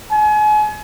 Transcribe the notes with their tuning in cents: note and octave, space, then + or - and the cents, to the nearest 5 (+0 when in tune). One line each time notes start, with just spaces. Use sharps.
G#5 +35